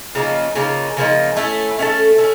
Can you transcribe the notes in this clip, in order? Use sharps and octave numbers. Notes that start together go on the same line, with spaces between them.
C#3 F3 A#3 D#4
C#3 F3 A#3 D#4
C#3 F3 A#3 D#4
A3 C#4 E4 A4
A3 C#4 E4 A4
A3 C#4